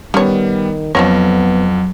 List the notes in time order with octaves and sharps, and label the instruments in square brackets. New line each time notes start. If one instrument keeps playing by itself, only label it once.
[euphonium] D#3 [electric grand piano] G3 B3 [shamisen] C#4 C#5
[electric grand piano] F2 [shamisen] F3 C#4 C#5 [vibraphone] F#3 [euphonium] B3